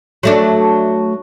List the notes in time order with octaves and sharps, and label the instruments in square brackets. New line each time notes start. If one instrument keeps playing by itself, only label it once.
[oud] F#3 A3 D4